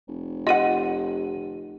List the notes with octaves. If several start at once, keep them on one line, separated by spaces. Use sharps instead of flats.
F1
F4 G4 D#5 F#5 D#7